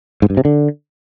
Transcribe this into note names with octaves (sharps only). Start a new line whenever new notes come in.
G#2
G2
C3
D3